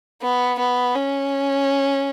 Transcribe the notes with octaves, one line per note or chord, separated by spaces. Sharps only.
B3
B3
C#4